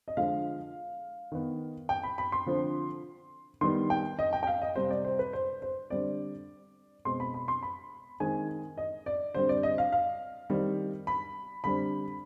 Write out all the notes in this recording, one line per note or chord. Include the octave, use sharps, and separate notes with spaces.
D#5
D3 F3 G#3 F5
D#3 B3
G5
B5
B5
C6
D3 F3 C4
D#3 G3 B3 C6
G5
D#5
G5
G5
F5
D#5
C3 G3 C4 C5
D5
C5
B4
C5
C5
D3 G3 C4 D5
B2 G#3 C4 C6
B5
B5
C6
B5
D#3 G#3 C4 G#5
D#5
D5
D3 G3 C4 C5
D5
D#5
F5
F5
D#3 G3 C4
B5
D3 G3 C4 B5